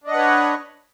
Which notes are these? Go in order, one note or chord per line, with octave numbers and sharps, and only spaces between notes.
D4 B4 C#5 D#5 F#5